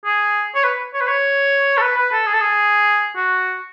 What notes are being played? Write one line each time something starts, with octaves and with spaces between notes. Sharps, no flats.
G#4
C#5
B4
C#5
B4
C#5
A4
B4
B4
A4
G#4
A4
G#4
F#4